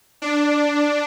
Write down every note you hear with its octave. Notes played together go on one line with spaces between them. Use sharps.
D4